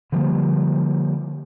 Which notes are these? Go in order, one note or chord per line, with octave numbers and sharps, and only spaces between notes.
D3 F3 G3 A#3